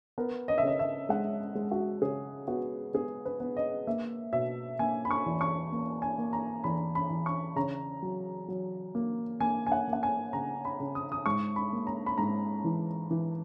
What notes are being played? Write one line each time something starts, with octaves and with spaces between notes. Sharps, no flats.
B3 A#4
D#5
E5
C#3 D#5
E5
G#3 F#5
G#3
F#4
C#3 G#4
B3 F#4
B3 G#4
B4
B3
D#5
A#3 E5
B2 E5
A#3 G#5
B5
C#6
E2
C#6
A#3
G#5
A#3
A#5
E2 B5
B5
E2
C#6
C#3 A#5
F#3
F#3
A#3
A#3 G#5
G#5
F#5
A#3
F#5
G#5
C#3 A#5
B5
C#3
D#6
D#6
G#2 C#6
B5
A#3
A#5
B5
G#2 A#5
E3
E3